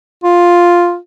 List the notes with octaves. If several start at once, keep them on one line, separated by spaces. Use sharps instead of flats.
F4